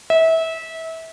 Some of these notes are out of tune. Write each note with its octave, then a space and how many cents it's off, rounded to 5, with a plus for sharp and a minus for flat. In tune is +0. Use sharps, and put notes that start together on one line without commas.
E5 -25